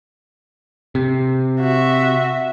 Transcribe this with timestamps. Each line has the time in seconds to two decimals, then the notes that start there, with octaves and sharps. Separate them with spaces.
0.95 C3
1.60 F#4 E5